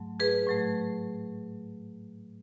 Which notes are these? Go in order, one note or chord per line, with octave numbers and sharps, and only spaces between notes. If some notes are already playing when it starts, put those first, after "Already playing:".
Already playing: G#2 F#3 A3
G#4 B4
A2 F#3 A3